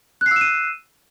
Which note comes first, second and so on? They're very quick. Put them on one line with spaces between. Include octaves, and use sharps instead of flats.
F#6 C7 E6 E7 D#7